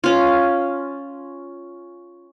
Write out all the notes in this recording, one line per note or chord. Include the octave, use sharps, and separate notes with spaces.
C#4 F4